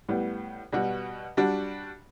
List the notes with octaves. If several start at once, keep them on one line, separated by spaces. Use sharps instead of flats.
A2 G3 B3
B2 G3 B3 F#4
G3 D4 F#4